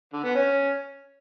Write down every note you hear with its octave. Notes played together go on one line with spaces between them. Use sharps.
D3
B3
C#4